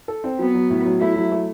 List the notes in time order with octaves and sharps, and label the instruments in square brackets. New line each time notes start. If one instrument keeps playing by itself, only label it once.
[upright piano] A4
C4
[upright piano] F#3 [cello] B3
[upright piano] F#3
A2
F#3
[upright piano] A3 [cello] E4
[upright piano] F#3
A3